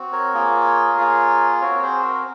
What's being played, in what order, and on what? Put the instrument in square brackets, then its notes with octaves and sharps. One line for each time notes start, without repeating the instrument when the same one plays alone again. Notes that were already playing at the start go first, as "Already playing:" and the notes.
Already playing: [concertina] C4 F#4
A#4 C#5
A#3 F4 G#4
A#3 F4 G#4
C4 F#4 A#4 C#5
G#4 C5
A#4